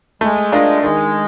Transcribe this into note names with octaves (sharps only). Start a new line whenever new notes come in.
G#3 A3
D4 F4 A#4 D#5
D#3 G#3